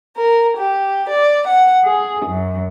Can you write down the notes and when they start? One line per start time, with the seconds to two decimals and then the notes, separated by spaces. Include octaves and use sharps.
0.17 A#4
0.59 G4
1.09 D5
1.49 F#5
1.84 G#4
2.27 F#2